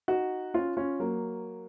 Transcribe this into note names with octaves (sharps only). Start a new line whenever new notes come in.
D#4 F#4
C#4 F4
C#4 F4
F#3 A#3